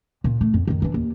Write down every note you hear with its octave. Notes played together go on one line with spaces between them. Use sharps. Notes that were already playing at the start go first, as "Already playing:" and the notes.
A#2
A3
F2
F#2 D#3
E3 D4
D#2